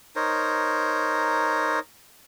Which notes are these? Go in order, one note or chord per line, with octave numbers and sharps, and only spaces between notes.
D#4 A#4 C5 C#5